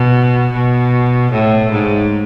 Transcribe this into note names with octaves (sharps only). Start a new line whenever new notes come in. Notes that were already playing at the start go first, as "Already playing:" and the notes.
Already playing: B2
B2
A2
G#2